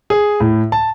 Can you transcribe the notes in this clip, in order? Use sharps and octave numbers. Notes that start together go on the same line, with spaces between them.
G#4
A2
A5